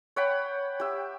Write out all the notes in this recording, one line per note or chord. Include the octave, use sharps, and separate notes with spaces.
C#5 F#5 G5 B5
G4 E5